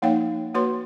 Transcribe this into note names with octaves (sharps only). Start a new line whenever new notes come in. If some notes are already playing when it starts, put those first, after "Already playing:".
F3 A#3 D#4 C#5 F5 G5
A#3 F#4 B4 C#5 C6